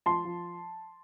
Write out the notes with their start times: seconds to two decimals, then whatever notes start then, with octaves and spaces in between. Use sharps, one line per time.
0.06 F3 A5 C6
0.25 F3